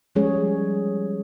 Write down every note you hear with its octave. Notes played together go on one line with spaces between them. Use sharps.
F3 G3 G#3 C#4 G#4 C#5